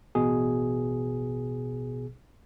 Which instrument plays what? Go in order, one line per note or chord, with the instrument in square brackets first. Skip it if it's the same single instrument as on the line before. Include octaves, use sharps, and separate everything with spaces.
[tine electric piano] A1 B2 G#4